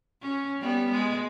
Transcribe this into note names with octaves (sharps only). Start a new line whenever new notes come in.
C#4
G3 B3
G#3